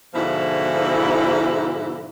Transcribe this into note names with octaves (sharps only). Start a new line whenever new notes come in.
G#2 B2 D3 F3 E4